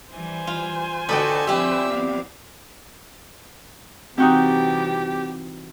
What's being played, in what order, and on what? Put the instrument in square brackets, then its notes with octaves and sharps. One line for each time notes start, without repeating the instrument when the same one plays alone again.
[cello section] E3 G3 [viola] C5 G#5
[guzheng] F4
[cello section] D3 D4 F#4 [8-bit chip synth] A4 D5 [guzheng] B4 D#5 G5
[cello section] F3 C4 E4 [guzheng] G3 G4 [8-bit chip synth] E5 E6
[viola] B3 F5
[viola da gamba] C3 E3 G3 [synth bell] C4 [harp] D#4 F#4 G5 [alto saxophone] G4